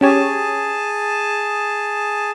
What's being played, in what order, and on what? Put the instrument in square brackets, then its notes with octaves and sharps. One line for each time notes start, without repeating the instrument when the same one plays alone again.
[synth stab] C#4 G4 C#5 [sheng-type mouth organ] G#4 A5